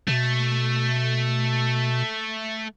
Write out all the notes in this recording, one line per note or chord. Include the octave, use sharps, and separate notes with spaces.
B2 A3